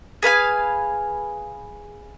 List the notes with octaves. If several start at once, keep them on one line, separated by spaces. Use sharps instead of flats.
G#4 B4 F5 G#5